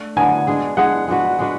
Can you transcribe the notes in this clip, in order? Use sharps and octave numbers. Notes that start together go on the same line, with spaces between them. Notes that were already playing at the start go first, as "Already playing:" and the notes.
Already playing: A3 D4
D3 F#3 B3 G#5
G#3 D4 G#4
G#3 D4 G#4 F#5
G#3 D4 F#4 B4
G#3 D4 F#4 B4